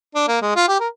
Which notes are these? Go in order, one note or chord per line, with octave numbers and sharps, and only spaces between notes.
D4
A#3
G#3
F4
G4
A#4